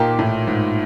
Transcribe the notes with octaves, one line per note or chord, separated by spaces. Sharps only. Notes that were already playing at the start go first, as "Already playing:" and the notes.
Already playing: A#2 F3 A#3 D#4 G4
A2
G#2